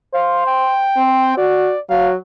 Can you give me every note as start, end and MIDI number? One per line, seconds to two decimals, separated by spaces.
0.14 0.82 72
0.14 0.42 77
0.47 1.37 79
0.97 1.33 60
1.37 1.74 66
1.37 1.80 74
1.90 2.16 54
1.90 2.09 77